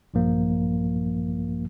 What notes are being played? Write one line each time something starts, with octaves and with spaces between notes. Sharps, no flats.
A#1 G2 F3 A#3